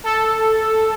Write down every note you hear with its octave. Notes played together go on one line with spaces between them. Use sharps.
A4